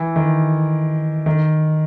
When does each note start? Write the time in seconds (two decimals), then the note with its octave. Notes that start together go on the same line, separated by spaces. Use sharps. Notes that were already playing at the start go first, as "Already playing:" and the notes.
Already playing: E3
0.16 D#3
1.26 D#3